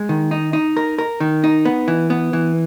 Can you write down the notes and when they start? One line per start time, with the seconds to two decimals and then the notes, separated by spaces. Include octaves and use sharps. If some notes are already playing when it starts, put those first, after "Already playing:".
Already playing: G#3
0.09 D#3
0.31 D#4
0.53 D#4
0.77 A#4
0.98 A#4
1.20 D#3
1.44 D#4
1.65 B3
1.88 E3
2.10 B3
2.33 E3